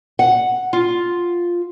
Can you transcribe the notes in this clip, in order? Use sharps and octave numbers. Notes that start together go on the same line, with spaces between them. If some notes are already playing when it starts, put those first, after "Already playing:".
F#5
F4